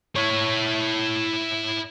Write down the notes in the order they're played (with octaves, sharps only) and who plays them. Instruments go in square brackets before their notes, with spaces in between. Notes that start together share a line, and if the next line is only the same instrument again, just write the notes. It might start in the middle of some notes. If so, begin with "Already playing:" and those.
[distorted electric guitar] E4 C#5